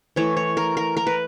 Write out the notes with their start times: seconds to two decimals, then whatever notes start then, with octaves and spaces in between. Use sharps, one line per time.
0.16 E3 A3 C#5
0.37 C#5
0.57 A#4
0.77 A#4
0.97 A#4
1.07 B4